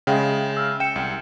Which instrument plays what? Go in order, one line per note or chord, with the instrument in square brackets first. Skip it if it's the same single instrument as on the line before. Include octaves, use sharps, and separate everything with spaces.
[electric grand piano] C#3 G#3 [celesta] E5 F5 G5
[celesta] E6 F6
[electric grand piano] G5 [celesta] C#7 E7
[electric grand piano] C2